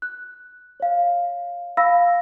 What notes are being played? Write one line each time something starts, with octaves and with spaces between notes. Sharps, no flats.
F#6
C#5 F5
F5 B5 E6 A#6